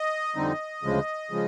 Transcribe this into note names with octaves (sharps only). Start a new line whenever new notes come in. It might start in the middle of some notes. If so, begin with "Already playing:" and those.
Already playing: D#5
F2 D3 G3 C4 D#4
D2 C#3 F3 G#3
C#3 F3 G#3